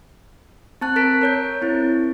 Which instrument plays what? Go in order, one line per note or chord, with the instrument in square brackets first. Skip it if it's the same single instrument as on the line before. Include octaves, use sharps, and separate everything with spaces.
[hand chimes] C4 A5 F#6
A#4 B6 D7
A#4 C#5 G6
C4 E4